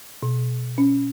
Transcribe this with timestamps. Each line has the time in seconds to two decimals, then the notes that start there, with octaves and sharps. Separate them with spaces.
0.23 B2
0.78 C#4